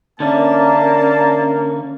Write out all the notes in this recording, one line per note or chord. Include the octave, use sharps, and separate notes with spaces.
D3 A#3 C#4 D5 E5 A5